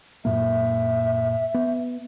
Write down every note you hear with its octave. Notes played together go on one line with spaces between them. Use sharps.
F#2 A#2 A#3 E5
B3